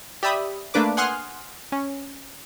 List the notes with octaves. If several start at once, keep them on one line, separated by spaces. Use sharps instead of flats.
G4 D5 E5 B5 D#6
A3 A#3 D4 B4 D6
F#5 G#5 C6 D#6 F6 F#6
C#4